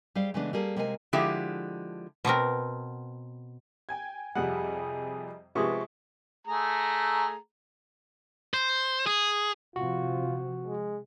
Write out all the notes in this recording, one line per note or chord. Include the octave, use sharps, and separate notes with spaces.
G3 G#4 C5 F5
C#3 E3 G#3 A3 B3 D4
G3 A#3 G#4 A4
C3 G#3 A#3 A#4 D#5 G#5
D3 F3 G#3 E4 G4
B2 B3 C4 A#4
G5 G#5 G#6
F2 C3 G3 G#4 F#5
C3 F3 G#3 B3 G4 C#6 D#6
A3 G#4 A#5
C5
G#4
C3 F3 F4 F#4
G#3